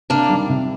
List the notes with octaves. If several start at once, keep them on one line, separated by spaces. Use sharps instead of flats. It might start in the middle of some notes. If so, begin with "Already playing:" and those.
C3 A#3 D4
D#3 G3
C3